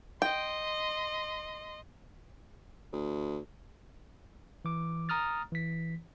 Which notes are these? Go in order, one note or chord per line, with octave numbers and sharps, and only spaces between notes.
D#5 G5 C6
D2
E3 D6
A#5 D#6 F6 A6
E3 B6